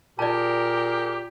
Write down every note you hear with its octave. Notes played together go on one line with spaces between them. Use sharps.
A#2 G4 G#4 A#4 D5 A5